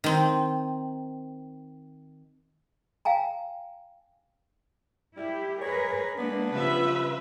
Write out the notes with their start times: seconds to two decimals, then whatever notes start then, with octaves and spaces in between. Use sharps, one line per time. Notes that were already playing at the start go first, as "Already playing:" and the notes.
0.04 D#3 C4
3.05 F5 G5 G#5 A#5
5.17 G3 E4 G4
5.61 G#4 A#4 B4 C#5
6.19 G#3 A#3 B3 D4
6.54 C#3 F3 G3 B4 E5